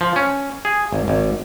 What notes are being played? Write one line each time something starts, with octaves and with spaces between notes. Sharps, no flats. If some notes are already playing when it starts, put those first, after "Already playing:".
F3
C#4
G#4
G#1
G#1